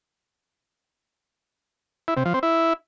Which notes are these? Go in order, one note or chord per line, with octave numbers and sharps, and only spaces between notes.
E4
C3
F3
C4
E4